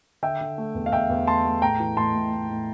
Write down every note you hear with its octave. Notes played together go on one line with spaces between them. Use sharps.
D3 E5 G5
D3
A3
E2
F5
E2 E5 G5
E2
A3 A5 C6
A3
A2 G5 A#5
E3
A2 A5 C6
A2
A2
A2